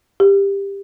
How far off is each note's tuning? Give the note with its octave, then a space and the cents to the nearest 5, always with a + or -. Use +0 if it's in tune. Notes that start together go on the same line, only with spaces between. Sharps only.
G4 +15